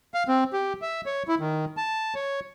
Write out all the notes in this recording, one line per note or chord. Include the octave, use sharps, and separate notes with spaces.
F5
C4
G4
E5
C#5
E4
D#3
A5
C#5